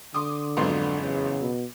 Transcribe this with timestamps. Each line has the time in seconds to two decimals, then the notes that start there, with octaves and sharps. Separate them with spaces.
0.14 D3 C6 D6 D#6
0.57 G#1 F2 F#3 B3 C6
1.02 E2 C#3
1.41 B2